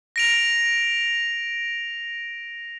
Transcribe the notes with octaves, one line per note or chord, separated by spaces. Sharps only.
A#6 D7 F7